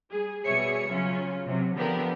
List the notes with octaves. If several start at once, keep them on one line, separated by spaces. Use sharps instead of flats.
G3 G#4
B2 G3 G#4 C#5 E5 C#7
C#3 F#3 C#4 F4
C3 F#3
D3 F3 B3 G4 A#4